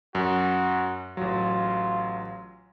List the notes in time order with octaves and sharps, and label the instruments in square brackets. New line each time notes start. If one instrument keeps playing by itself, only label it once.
[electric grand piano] F#2 [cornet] F#4
[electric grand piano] A1 F#3 [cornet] F4